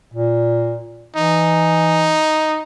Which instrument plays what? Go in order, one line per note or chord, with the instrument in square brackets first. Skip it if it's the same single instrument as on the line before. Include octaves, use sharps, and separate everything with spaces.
[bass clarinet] A#2
[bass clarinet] E3 [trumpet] D#4